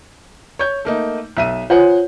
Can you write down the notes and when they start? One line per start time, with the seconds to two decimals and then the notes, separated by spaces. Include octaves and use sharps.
0.59 C#5 G6
0.85 A3 A#3 D#4
1.37 B1 E5 D#7
1.70 F4 C5 C#5 F#5 G#5